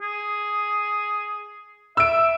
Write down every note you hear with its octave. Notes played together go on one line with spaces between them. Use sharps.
G#4
E5 E6 D7